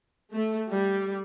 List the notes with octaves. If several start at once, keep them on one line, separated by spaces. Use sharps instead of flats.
A3
G3